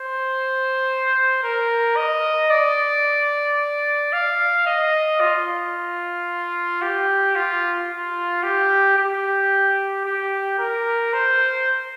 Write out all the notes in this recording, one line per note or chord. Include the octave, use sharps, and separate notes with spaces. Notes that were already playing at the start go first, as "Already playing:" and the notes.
Already playing: C5
A#4
D#5
D5
F5
D#5
F4
G4
F4
F4
G4
G4
G4
A#4
C5